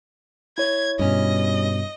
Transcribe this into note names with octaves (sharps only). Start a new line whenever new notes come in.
E4 C#5 G#6
G2 B2 G3 C#4 D#5